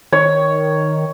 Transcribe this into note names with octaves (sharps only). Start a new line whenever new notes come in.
D#3 C#5